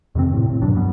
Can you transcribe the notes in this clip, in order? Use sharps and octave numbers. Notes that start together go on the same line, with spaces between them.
F2 C3 D#3 C4
A2 C3
A2
G2 B2 F#3 D4
E1 F#2 G3 B3